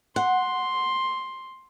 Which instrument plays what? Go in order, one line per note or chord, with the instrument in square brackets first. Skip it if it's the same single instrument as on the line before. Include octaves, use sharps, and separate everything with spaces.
[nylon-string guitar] F#5 [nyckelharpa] C6